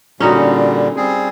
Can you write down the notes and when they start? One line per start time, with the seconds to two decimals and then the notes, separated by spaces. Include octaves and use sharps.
0.20 A#2 D3 G3 C#4 D#4 F#4
0.96 G3 C4 G#4